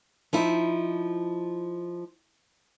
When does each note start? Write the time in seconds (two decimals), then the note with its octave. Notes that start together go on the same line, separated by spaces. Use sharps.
0.33 F3 D#4 E4